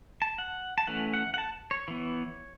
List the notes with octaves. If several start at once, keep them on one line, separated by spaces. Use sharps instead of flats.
A5
F#5
A5
E3 A3 C#4 F#5
F#5
F#5
A5
C#5
E3 B3